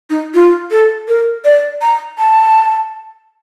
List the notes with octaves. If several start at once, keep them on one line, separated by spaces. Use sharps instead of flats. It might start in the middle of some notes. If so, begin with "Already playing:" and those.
D#4
F4
A4
A#4
D5
A#5
A5